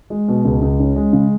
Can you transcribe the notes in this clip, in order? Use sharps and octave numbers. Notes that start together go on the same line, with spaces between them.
G#3
B2
C#2
C#2
C#4
G#3
C#3